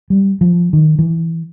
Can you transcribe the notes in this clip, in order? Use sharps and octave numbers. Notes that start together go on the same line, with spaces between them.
G3
F3
D#3
E3